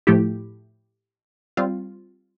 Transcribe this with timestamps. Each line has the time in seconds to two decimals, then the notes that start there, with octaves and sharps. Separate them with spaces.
0.07 A2 F3 A3 E4 G4
1.57 G3 C4 F4